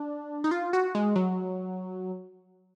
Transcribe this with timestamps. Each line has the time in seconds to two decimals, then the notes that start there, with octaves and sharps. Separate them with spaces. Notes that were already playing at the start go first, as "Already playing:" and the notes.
Already playing: D4
0.44 D#4
0.51 F4
0.73 F#4
0.95 G#3
1.16 F#3